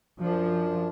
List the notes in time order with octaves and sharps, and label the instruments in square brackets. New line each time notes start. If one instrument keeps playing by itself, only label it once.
[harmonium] F#2 D4 [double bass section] F3